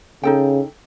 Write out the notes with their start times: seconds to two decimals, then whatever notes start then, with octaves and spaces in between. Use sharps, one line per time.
0.23 C#3 D#4 A4 G5